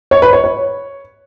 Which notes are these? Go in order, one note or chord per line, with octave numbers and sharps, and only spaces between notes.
C#5
B4
C#5
C#5